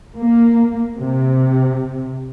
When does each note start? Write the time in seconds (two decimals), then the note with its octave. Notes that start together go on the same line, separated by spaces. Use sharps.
0.18 A#3
0.98 C3